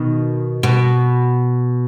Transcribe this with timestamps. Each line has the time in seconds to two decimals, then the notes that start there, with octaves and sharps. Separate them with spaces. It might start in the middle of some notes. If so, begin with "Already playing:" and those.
Already playing: B2 D#3
0.63 B2